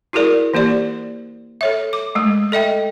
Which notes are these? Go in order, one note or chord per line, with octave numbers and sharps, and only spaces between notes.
E4 F#4 G#4 A#4 D5
E3 A#3 G4 D5
A4 C#5 E5
D6
G#3 A3
A4 D#5 E5 G5